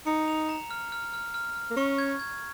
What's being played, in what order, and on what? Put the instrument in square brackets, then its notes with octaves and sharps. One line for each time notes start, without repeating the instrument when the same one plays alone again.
[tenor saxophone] D#4 [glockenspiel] C#7
[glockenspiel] F7
A#5
F6
F6
F6
F6
F6
[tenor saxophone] A#3
[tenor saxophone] C#4 [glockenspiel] C#6
[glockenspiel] G#6
G#6